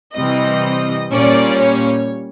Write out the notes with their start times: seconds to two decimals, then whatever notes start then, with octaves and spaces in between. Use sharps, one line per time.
0.15 C3 E3 G3 C4 D#5
1.11 A#2 G3 A#3 C#4 D5
1.60 C#5